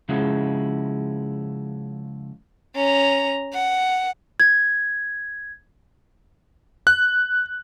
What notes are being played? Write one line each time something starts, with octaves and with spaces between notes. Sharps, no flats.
C#3 F3 G#3 E4 F#4
C#4 A#5
F#5
G#6
F#6